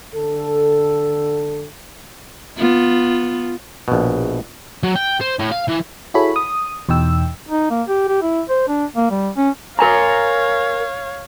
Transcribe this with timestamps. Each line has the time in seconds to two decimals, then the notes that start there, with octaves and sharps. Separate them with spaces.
0.14 D3 A4
2.57 B3 F4
3.88 A#1 B2
4.83 F#3
4.96 G5
5.21 C5
5.39 A2
5.52 F5
5.69 E3
6.14 E4 F#4 G#4 A4 C#5 B5
6.36 D#6
6.89 E2 B2 D#4 G5 E6
7.49 D#4
7.70 A#3
7.88 G4
8.08 G4
8.22 E4
8.49 C5
8.68 D4
8.96 A#3
9.11 G3
9.37 C#4
9.79 A#4 C#5 F5 G#5 A#5